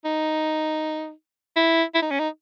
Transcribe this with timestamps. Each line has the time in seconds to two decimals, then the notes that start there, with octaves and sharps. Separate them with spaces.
0.05 D#4
1.56 E4
1.95 E4
2.02 D#4
2.11 C#4
2.19 D#4